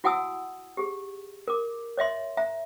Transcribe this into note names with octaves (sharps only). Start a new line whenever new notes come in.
E4 F#4 F#5 G#5 D#6 E6
G4 G#4
A#4 D6
C#5 D#5 E5 C6
E5 A#5